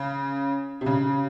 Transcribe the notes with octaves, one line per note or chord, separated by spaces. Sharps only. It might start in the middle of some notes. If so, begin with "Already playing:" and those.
Already playing: C#3
C3
C#3